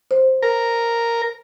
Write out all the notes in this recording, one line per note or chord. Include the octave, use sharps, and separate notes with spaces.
C5
A#4